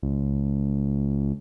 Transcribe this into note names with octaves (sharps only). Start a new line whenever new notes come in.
C#2